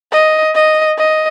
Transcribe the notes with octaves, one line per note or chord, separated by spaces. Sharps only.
D#5
D#5
D#5